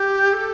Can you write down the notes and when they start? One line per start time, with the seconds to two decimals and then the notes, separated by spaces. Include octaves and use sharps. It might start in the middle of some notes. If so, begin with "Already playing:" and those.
Already playing: G4
0.33 A4